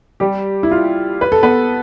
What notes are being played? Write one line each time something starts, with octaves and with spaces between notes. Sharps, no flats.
G3 G4
E4
F4
B4
A4
B3 B4